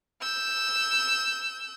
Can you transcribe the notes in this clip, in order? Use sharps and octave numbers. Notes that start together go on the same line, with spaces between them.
E6 G6